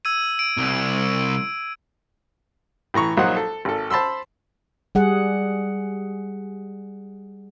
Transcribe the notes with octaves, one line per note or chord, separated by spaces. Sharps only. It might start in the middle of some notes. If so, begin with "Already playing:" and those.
E6 G#6 D#7
D7
C2
A2 E3 A#5 C#6
A#1 F#3 D#4 C5 F#5
A4
G#1 A4
C5 A5 B5 C6 E6
G3 G#4 F#5